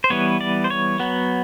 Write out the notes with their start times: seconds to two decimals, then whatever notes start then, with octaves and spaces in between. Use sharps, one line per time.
0.04 C5
0.10 E3 G3 B3 C#5
0.41 D5
0.64 C5
0.70 C#5
1.00 F#3 B3